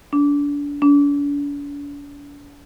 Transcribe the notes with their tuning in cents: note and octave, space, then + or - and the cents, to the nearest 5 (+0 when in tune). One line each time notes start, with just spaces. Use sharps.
D4 -30
D4 -45